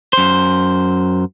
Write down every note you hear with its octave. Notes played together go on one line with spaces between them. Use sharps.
F#2 C5